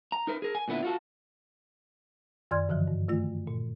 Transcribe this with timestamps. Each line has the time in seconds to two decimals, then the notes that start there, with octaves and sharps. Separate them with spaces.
0.12 A#5
0.27 D#4 A#4 B4
0.42 G#4 A#4
0.55 G#5
0.68 A#2 D3 B3 E4
0.83 F4 F#4 A4
2.51 F#2 D#3 D5 C6 F6 G#6
2.69 G2 D3 E3 F3
2.87 G2
3.09 D#3 A3 F4
3.47 A#2